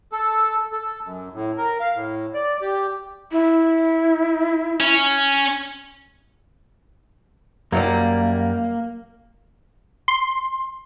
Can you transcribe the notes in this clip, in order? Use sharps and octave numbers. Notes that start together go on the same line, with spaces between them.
A4
A4
F#2
A2
A#4
F5
A2
D5
G4
E4
C#4
F#2 F#3 G3 A#3
C6